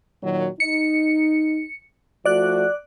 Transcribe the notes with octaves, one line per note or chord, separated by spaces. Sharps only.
A#2 D#3 F#3
D#4 C#7
F3 A3 F#4 D5 F#6